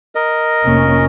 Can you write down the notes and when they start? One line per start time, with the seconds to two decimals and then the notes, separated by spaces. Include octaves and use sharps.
0.15 A#4 D#5
0.65 F1 A#3 C#4